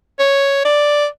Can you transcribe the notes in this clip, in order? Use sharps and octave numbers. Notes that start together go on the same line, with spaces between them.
C#5
D5